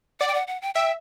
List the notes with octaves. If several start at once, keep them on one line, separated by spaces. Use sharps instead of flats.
D5 F#5
G5
F#5
F#5
G5
E5 G5